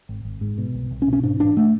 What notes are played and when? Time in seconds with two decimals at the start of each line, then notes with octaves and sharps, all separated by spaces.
0.09 G#1
0.25 G#1
0.41 G#2
0.58 B2
0.74 C2
0.91 C2
1.02 C#4
1.07 B2
1.13 C#4
1.23 G#2 D4
1.40 A1 D4
1.57 A3